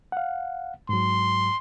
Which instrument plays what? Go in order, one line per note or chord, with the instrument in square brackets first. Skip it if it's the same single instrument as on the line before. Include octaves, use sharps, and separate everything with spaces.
[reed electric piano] F5 F#5
[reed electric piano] G#2 F#3 [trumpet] C6